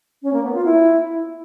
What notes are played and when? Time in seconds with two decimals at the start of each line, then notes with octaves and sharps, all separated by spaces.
0.23 C#4
0.33 A#3
0.44 B3
0.54 F4
0.65 E4